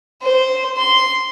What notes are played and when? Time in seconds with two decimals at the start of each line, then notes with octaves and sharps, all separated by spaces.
0.23 C5
0.77 C6